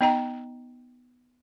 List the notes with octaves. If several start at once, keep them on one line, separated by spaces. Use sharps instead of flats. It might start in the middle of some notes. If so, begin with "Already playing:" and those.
B3 D#4 D#5 G5 A#5